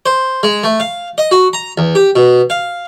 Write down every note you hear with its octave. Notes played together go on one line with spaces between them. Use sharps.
C5
G#3
A3
F5
D#5
F#4
A#5
E2
G4
B2
F5